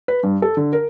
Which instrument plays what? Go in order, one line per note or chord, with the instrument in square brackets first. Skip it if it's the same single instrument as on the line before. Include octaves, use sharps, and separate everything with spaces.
[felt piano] B4
G2
A4
D3
A#4